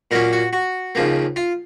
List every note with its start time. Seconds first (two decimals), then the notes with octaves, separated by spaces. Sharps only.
0.11 A#2 F#3 A#3 C#4 A#4
0.33 F#4
0.53 F#4
0.95 D#2 C#3 F3 A#3
1.36 F4